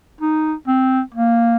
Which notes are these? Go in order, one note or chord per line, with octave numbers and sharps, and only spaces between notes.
D#4
C4
A#3